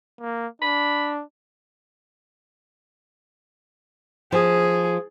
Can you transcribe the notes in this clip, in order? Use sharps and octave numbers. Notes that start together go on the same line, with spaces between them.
A#3
D4 B5
F3 G#4